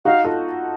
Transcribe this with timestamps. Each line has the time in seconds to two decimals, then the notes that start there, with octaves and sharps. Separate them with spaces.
0.05 D#4 F#4 F5
0.24 F4 A4